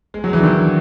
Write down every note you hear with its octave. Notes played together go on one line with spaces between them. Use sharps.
G#3
F#3
E3
D3
D#3